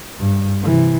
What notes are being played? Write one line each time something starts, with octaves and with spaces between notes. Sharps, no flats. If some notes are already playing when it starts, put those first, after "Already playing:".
G2
C3 E3